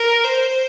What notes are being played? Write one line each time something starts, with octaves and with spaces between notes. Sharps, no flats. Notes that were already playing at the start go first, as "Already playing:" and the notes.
Already playing: A#4
C5